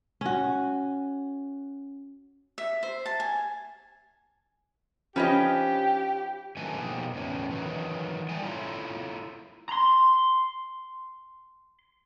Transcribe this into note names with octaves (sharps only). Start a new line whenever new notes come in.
C#4 F#4
E5
C5
A5
G#5
F3 C#4 D#4 G4 B4 C#5 D#5
F#2 D#3 A3 B4 G#5
B2 F3 A#3 D#4 G4 G#4
E2 A2 C#4
D#3 E3 F#3
G3 A3 G5 G#5
E4 F4 A4 C#5 E5 A#5
A#5 C6